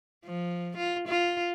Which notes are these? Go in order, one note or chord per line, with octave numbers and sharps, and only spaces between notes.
F3
F4
F4